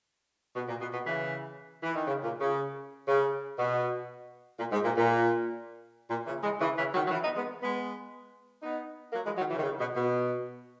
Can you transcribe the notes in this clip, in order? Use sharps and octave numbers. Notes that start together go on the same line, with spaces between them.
B2
A#2
B2
B2
C#3 E3
E3
D#3
C#3
A#2
C#3
C#3
B2
A#2
G#2
A#2
A#2
A#2
C#3 E3
E3 G#3
C#3 E3
C#3 E3
D#3 F#3
F#3
C#3 E3
B3 D#4
G#3 B3
G#3 B3
B3 D#4
F#3 A#3
E3 G#3
D#3 F#3
C#3 E3
D#3
C#3
B2
B2